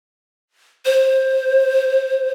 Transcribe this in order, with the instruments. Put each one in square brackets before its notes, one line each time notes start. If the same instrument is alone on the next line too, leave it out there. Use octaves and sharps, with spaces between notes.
[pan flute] C5